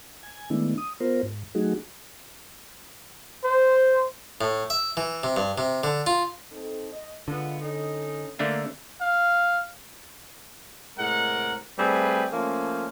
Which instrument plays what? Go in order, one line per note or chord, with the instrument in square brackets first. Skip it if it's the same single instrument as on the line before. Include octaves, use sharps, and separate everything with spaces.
[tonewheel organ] G#5
D#3 G#3 A3 B3 D4 E4
D#6
B3 F4 A#4 C5
G#2
F#3 A3 D#4 F#4 G#4
[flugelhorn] C5
[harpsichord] A2
E5
E3
C3
G2
C3
D3
F4
[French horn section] C4 D#4 A4
D#5
[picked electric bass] D3 [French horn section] G#3 F4 [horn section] B3
[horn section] C#4 D#4 [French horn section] A4
[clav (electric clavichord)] D3 A3 D4 [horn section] A#3
[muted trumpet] F5
[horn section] A2 C3 G#3 A#4 F#5
G3 A3 C4 G#4 B4
F3 A3 A#3 C#4